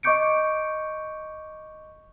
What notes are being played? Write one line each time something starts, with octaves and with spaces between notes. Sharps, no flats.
D#5 C#6 D6 G6 C#7 D7